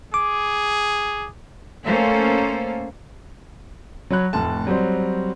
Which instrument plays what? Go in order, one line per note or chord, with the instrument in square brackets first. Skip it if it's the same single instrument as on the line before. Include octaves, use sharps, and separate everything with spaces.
[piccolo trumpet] G#4 [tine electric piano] D6
[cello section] A3 A#3 C#4 A4 C5 F5
[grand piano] F#3 C#5 B5 F#6
F1 A2 A3 A5
F#3 G3 C4 C5